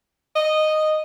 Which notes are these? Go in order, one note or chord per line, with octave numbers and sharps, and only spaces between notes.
D#5